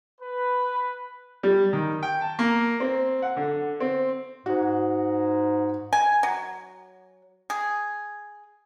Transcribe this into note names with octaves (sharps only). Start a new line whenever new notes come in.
B4
G3
D#3
G5
A5
A#3
C4
F#5
D3
C4
G#2 F#4
G#5
F#3
G#4